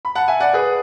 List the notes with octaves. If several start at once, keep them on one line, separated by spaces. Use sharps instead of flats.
B5
F#5 A5
E5 G#5
D5 F#5
G#4 B4